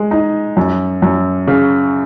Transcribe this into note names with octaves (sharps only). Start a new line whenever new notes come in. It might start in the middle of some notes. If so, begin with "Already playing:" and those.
Already playing: G#3
D#4
F#2
F#2
C#3